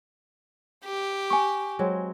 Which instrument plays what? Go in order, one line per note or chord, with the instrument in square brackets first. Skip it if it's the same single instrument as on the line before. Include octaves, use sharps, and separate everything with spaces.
[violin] G4
[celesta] G#5 C#6
[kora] F#3 G#3 C4